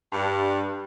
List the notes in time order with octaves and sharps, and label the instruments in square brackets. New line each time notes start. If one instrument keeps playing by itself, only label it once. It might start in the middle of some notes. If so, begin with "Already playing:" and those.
[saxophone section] G2